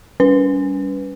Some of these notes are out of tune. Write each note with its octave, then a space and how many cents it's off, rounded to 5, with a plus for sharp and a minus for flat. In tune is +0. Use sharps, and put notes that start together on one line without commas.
G3 +0 C#4 +30 B4 +0